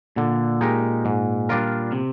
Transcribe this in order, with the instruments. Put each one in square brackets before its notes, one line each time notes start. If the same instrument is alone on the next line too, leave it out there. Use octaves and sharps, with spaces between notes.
[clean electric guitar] A#2 [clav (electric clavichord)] D3
[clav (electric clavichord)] G#3 D#4 G4 A#4
G#2
G3 D4 F4 A#4
[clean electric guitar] C3